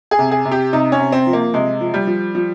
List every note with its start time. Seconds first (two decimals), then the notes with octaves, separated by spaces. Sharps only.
0.11 G#4
0.19 C3
0.31 G#4
0.45 C3
0.51 G4
0.73 C3 D#4
0.92 C#4
0.99 C3
1.12 C4
1.27 F3
1.33 A#3
1.54 C3 G#3
1.81 F3
1.94 G3
2.07 F3
2.35 F3